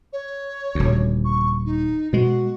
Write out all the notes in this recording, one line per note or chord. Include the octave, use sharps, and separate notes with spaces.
C#5
D#1 D2
C#6
D#4
B2 G#3 F#4